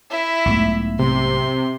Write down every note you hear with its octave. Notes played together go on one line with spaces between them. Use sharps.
E4 E5
B1 G#2 A3
C3 C6